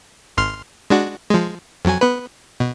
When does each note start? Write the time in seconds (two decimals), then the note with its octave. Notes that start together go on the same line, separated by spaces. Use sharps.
0.37 G#1 C6 F6
0.90 G#3 D4 F#4
1.30 F3 G#3
1.85 F2 F#3 G#5
2.01 B3 B4
2.60 B2